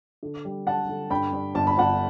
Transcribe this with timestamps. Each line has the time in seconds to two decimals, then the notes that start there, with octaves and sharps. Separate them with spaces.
0.23 D3
0.45 G3
0.66 D3 F#5 A5
0.89 D3
1.10 G2 G5 B5
1.33 G2
1.55 G1 A5
1.67 B5
1.77 G1 F#5 A5